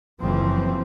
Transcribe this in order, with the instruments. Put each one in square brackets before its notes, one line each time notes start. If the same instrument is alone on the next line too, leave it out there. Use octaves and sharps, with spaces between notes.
[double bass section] F#1 E3 F3 C4